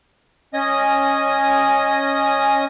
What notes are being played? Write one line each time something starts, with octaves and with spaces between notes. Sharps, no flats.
C#4 D#5 G#5 D#6